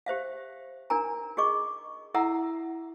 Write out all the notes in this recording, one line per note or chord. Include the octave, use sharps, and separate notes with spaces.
G4 C5 E5 F5
D4 D#4 A#4 G#5 A#5
F#4 G#4 D#5 C#6 D6
E4 A4 E5 F#5 A#5 E6